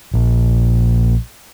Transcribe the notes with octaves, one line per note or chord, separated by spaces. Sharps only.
A#1